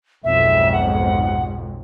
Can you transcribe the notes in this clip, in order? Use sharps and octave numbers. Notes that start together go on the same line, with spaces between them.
B1 F2 G#2 E5
F#5